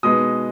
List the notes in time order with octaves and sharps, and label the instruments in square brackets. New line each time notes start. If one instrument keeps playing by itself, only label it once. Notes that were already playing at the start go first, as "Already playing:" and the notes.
[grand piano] B2 G#3 B3 D#4 D#6